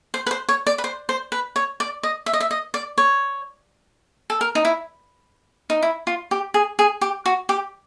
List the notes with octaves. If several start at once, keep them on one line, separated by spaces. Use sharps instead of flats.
C5
B4
C5
C#5
D5
B4
C5
C5
B4
C#5
D5
D#5
E5
D#5
E5
D#5
D5
C#5
A4
A#4
D#4
E4
D#4
E4
F4
G4
G#4
G#4
G4
F#4
G4